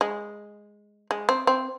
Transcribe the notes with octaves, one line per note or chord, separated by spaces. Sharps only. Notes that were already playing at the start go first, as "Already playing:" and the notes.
G#3
G#3
C4
C4